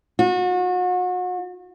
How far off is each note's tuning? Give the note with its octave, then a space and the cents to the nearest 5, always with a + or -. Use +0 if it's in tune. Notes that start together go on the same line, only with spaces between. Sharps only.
F#4 -35